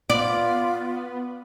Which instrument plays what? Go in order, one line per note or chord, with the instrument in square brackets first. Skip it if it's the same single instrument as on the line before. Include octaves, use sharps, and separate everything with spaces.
[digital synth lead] B3 [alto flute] F4 [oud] D5